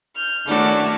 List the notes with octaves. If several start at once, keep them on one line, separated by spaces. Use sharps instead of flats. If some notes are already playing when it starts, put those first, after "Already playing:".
F6 G6
D#3 A3 C#4 D4 E4 F#4